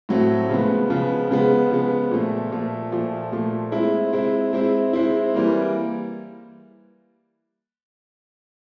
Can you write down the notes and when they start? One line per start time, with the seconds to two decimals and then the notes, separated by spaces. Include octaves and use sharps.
0.09 A2 F#3 A3 C4
0.49 C#3 F3 G#3 B3
0.90 C#3 F3 G#3 B3
1.30 C#3 F3 G#3 B3
1.70 C#3 F3 G#3 B3
2.11 A#2 F3 A3
2.52 A#2 F3 A3
2.92 A#2 F3 A3
3.32 A#2 F3 A3
3.72 G#3 C4 E4
4.13 G#3 C4 E4
4.53 G#3 C4 E4
4.93 G#3 C4 E4
5.34 E3 G3 A#3